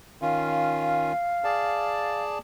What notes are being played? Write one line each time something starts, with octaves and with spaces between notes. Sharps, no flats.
D#3 C#4 F4 F5
G#4 D5 A5